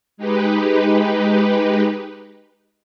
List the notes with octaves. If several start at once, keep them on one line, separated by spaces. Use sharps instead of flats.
G#3 D#4 G4 B4